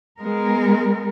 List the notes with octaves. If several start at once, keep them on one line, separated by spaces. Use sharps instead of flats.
G#3 B3 A#4